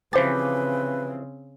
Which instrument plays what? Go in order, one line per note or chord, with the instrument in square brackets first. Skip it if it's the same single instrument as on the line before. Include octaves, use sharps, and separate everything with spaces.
[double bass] C#3 C4 [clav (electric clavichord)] E3 F3 G4 [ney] B4 [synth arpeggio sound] C5 A6